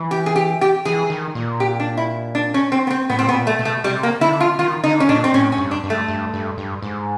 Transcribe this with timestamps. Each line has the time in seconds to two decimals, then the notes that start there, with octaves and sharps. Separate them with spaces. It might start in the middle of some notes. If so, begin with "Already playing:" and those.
Already playing: E3
0.11 G4
0.26 G#4
0.36 G4
0.61 G4
0.85 E3 G#4
1.10 D#3
1.35 A#2
1.60 G4
1.80 D4
1.97 E4
2.35 D4
2.54 C#4
2.72 C4
2.87 B3
2.91 C4
3.10 A2 B3
3.19 C4
3.26 B2 B3
3.34 A#2
3.47 A3
3.59 B2
3.65 A3
3.84 C3 G3
4.03 A#3
4.21 D3 E4
4.40 F4
4.59 D#3 F4
4.84 D3 D#4
5.00 C#4
5.09 A#2 D4
5.24 C4
5.34 A2 C#4
5.52 C#4
5.58 G2
5.71 D4
5.84 G2
5.90 A3
6.08 G2
6.34 G2
6.57 G2
6.82 G#2